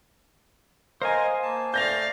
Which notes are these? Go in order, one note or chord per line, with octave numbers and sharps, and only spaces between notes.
A#4 C5 D#5 F5 G#5
A#3 A5
A3 D5 F5 G6 A#6 F7